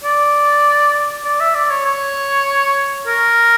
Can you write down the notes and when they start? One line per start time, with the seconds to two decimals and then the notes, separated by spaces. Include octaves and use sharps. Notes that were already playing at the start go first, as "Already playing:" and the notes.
0.04 D5
1.25 D5
1.41 E5
1.55 D5
1.70 C#5
1.86 C#5
3.07 A#4